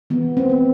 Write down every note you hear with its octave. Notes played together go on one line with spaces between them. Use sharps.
E3 B3
C4
B3